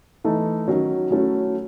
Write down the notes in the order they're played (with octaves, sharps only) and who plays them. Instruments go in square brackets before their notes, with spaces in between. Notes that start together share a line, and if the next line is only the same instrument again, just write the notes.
[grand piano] E3 A3 D#4 A4
D#3 F#3 C#4
F#3 A3 C#4 E4 A4